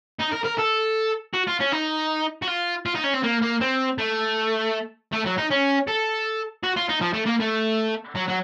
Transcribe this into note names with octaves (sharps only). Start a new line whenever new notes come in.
D#4
A#4
A#4
A4
F#4
F4
C#4
D#4
F#4
F4
F4
D#4
C#4
C4
A#3
A#3
C4
A3
A3
F#3
D#4
C#4
A4
F#4
F4
D#4
F3
A3
A#3
A3
F#3
F#3